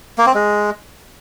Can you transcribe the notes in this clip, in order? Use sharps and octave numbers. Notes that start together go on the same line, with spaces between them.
A#3
C4
G#3